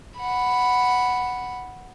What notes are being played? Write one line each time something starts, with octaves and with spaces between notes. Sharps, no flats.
F#5 B5